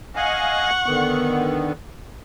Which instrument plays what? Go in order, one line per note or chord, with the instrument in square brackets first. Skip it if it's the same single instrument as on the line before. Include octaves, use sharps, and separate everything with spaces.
[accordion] D#5 F5 G#5 [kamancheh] F#5 C#6
[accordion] D3 D#3 B3